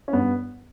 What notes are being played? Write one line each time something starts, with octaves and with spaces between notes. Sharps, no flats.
C#4
G2 B3